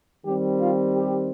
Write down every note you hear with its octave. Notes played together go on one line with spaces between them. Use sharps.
D#3 G3 C4 G4
F4
G4